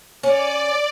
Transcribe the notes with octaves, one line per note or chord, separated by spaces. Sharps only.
C#4 D5